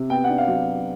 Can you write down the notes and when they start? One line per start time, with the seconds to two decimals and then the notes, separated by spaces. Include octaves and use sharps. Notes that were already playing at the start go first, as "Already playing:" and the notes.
Already playing: C3
0.10 B3 G5
0.24 F#5
0.29 D4
0.38 F5
0.48 F#3